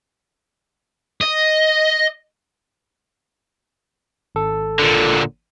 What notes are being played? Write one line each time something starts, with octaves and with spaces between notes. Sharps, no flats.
D#5
G#1 A4
A#2 D3